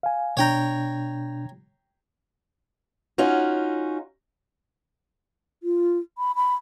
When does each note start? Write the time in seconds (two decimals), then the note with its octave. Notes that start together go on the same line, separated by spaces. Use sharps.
0.03 F5 G#5
0.37 B2 D4 C#5 G5 A#5 G6
3.18 C#4 D#4 F4 F#4
5.63 F4
6.18 B5
6.36 B5